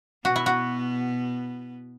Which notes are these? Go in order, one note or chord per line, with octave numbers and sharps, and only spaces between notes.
B2 B3 F#4
E4
F#4